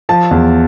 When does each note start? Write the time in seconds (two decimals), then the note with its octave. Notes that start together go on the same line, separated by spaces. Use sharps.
0.09 F3 A5
0.31 E2